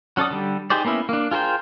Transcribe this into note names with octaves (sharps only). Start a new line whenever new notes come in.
F#3 C#4 A4 D5 D#6
D3 G3
D#4 G4 G#4 C5 D5
A#3 B3 C#4 E4
A#3 D4
F4 G#4 A#4 C5 G5